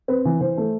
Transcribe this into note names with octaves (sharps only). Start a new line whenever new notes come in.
C4 B4
E3
E3 C5
A3